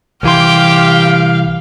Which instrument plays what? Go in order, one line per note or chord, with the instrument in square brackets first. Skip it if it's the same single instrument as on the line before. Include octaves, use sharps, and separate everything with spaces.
[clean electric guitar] C2 E3 C6 [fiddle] G4 G5 [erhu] F5